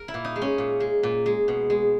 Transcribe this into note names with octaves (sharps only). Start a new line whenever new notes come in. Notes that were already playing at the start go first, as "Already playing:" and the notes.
Already playing: A#4
E4
A#2
D#4
G#3
C#4
A#2
G#3
A#2
G#3
B2
G#3